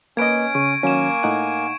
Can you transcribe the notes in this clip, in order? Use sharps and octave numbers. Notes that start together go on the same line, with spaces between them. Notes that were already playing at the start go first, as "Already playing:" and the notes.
A#3 C#4 B4 D#5 G#6 D7
C#3 C#6
D#3 F#3 A#3 C#4 G#5 C#6 E7
A2 D#4 F#5